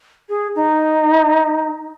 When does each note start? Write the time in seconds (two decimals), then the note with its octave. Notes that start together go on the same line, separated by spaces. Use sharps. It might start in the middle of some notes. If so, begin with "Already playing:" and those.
0.29 G#4
0.55 D#4